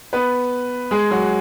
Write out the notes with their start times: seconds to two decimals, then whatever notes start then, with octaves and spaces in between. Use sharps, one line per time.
0.13 B3 B4
0.91 G#3 G#4
1.11 F#3 F#4